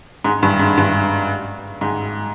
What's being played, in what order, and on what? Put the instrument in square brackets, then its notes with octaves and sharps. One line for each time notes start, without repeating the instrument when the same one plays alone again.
[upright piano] G#2
G2
G#2
G2
G#2